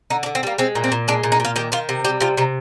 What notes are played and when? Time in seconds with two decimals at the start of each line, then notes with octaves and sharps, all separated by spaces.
0.10 D3 D#4
0.23 D4
0.26 D3
0.35 C4
0.43 G3 A#3
0.58 G#3 C4
0.75 A#2
0.84 C4
0.92 A#2
1.08 G#3 D4
1.23 A#2
1.32 D#4
1.40 A#2 F4
1.56 D#3 G4
1.72 D#3 F4
1.89 C3
2.04 G3 G4
2.20 C3 F4
2.37 C3 D#4